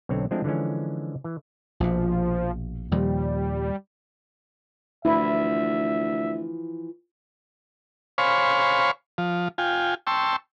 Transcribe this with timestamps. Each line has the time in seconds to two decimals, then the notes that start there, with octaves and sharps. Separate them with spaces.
0.09 B1 D3 C4 C#5
0.31 F3 G#3 A3 C4 D4 E4
0.44 D3 E3 F3 G#3 C#4
1.24 E3
1.80 A#1 B2 F3
2.92 D#2 A#2 F3 G3
5.05 D2 E3 F3 E4 E5
8.18 C5 C#5 F5 G#5 B5 C#6
9.18 F3
9.58 F4 G5 G#5
10.07 G5 A5 C6 C#6 E6